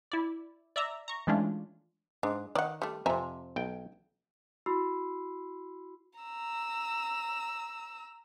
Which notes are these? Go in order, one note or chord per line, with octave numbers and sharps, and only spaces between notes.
E4 D5
D5 E5 A#5
A#5 C#6
E3 G#3 A3 C#4 D4 F4
G#2 D4
D#3 D5 F#5
G3 A3
F2 C3 E5 G#5 A#5
B1 G5
E4 F#4 B5 C6 E6 C7
A#5 E6